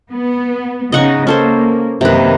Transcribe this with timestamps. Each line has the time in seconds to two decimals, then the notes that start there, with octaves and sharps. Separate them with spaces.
0.11 B3
0.92 C#3 D#4 D#5 F#5 C#6
1.27 A#3 C#4 A4 C5
2.01 F#2 C3 D#3 A#3 B4